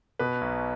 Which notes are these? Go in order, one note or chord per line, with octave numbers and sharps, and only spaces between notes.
B2 B4
B1